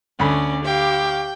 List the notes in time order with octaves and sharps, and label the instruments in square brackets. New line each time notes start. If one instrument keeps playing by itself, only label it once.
[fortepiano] D2 B5 [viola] C#4 D5
[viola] G4 F5 [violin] G5